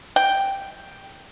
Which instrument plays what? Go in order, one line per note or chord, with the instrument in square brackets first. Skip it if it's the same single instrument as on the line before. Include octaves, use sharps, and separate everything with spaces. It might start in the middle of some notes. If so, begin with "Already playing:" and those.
[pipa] G5